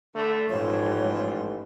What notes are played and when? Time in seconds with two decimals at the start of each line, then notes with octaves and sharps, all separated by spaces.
0.15 D3 A3
0.49 A1 G#2 F3 A3 C#5